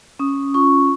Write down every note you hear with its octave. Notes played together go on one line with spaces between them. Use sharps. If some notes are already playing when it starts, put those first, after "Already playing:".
C#4 D#6
F4 C#6